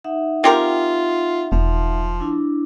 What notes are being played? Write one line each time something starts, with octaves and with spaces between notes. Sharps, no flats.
D#4 E5 F#5
C4 F4 G4 A#4
E1 F3
D4 E4